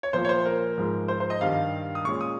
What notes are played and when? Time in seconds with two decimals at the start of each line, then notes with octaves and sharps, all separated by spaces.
0.03 C#5
0.13 A#2 F3 A#3 C5
0.25 C#5
0.29 C5
0.46 A#4
0.78 G#2 F3 G#3
1.08 C5
1.20 C5
1.30 D#5
1.41 G2 D#3 G3 F5
1.95 D#6
2.04 A#2 G#3 C#4 C#6
2.21 D#6